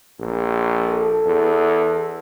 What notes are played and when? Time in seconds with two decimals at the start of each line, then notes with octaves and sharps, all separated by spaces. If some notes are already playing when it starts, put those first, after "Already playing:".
0.19 A#1
0.89 A4
1.26 E2